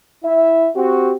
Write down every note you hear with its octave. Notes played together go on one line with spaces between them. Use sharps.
E4 E5
C4 F#4 G4